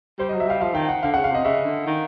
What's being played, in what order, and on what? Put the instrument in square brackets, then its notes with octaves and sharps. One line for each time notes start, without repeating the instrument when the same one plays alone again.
[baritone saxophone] G3 [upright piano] C5
[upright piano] D#5
[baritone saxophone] F#3
[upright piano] E5
[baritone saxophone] G3 [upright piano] F5
[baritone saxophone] F3 [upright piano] F5
[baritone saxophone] D#3 [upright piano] G5
[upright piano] F#5
[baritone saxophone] D3 [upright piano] F5
[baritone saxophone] C#3 [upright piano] F#5
[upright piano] F5
[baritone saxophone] C3 [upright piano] D#5
[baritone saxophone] C#3 [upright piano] E5
[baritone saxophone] D3
D#3